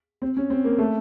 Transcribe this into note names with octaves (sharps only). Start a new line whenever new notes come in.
C4
C#4
C4
A#3
A3